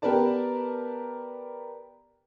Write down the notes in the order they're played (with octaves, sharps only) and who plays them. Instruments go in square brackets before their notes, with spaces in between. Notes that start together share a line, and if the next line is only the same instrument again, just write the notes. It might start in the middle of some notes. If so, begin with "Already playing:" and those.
[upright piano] B3 G4 A#4 B4 D5 A5